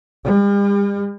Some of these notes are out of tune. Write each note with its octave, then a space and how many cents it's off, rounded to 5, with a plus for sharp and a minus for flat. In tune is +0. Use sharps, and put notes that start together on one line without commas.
G3 +45